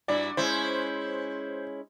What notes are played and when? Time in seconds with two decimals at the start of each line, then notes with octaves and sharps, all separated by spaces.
0.08 G2 E4 F#4 D5
0.37 G#3 C#4 E4 C5